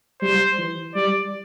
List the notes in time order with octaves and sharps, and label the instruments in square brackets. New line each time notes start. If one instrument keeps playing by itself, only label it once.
[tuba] G3 [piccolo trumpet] C5
[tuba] E3
[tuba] G3 [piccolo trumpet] D5